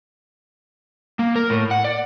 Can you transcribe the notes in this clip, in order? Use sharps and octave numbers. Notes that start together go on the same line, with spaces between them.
A#3
A#4
A2
F#5
D5